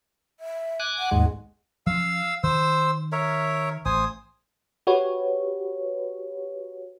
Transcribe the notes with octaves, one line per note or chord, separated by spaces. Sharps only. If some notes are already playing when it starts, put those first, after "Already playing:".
E5
G#5 D6 F#6
F#5
D#2 G#2 G#3
F3 C#4 F5 E6
D#3 C5 E6
A#4 C#5 E5
A1 C5 G#5 D#6
F#4 G4 B4 C#5